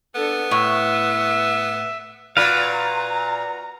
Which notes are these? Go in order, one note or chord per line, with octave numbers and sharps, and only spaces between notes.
B3 D4 A4
A2 E5
A#2 F#4 B4 D5 F5
A#5